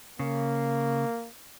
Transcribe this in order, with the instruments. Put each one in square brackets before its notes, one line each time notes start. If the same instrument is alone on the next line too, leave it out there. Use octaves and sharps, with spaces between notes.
[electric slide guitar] C#3 [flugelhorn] A#3